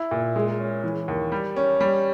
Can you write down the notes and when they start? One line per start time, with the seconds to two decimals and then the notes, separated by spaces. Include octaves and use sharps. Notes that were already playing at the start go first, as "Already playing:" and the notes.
Already playing: E4
0.11 A#2
0.36 G#3
0.59 C#4
0.84 E3
1.08 D#2
1.32 G3
1.57 C#4
1.81 G3